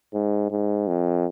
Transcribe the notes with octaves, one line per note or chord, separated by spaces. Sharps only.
G#2
G#2
F2